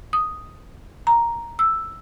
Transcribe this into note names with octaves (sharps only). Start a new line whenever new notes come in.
D#6
A#5
E6